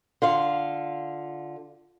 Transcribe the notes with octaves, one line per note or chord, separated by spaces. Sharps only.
D3 F4 F5